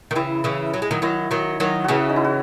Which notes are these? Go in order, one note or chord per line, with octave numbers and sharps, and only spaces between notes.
D#3
C#3 E3 E4
C#3 E3
F#3
G#3
D#3 F#3
D#3 F#3 E4
D#3 F#3
D#3 F#3
C#3 E3 F#4 G#4
D#4
E4
F#4